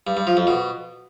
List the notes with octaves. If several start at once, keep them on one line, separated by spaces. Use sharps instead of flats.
G2
G2
F3
F2
B2